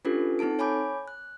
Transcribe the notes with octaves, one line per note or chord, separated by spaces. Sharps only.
C#4 D4 F4 G4 A4 B4
C4 D#4 A4 A5 D7
C#5 G#5 B5 D6 G6
F#6